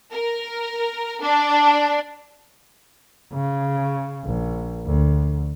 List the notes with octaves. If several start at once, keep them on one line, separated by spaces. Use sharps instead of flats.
A#4
D4
C#3
A#1
D2